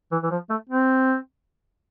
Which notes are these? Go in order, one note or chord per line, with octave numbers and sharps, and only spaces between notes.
E3
E3
F3
A3
C4